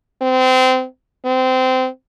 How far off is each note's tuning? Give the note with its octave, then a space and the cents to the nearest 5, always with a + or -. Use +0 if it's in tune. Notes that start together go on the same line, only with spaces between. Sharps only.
C4 -25
C4 -20